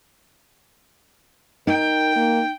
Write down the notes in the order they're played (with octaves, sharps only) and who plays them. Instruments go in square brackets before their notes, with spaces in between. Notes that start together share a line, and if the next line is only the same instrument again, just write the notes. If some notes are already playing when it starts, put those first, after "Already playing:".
[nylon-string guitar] D#4 [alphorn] A#4 [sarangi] G5
[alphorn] A#3